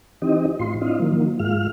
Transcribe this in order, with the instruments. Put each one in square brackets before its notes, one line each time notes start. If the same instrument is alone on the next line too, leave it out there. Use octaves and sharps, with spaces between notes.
[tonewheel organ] E3 C4 D#4 G4 D#5
A2 F4 C6
C4 D4 E4 F4 D#5 F5
D#3 F3 F#3 A#3
G#2 G#3 F4 F5 F6